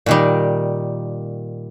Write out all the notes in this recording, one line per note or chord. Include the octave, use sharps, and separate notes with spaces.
A#2 D#3 G3